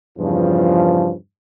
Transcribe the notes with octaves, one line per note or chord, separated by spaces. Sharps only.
E2 G2 C#3 F3